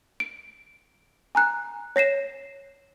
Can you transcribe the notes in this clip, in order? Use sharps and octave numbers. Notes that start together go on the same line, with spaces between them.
D7
G#5 A#5 F#6
C#5 A#6 C7 E7